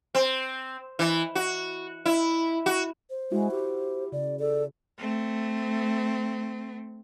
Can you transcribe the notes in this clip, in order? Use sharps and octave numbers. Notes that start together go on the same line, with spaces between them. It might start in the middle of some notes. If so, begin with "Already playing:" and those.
C4
E3
F#4
E4
F#4
C5
G#3 E4 F#4
G4
C#3 D5
A4 D5
A3 C4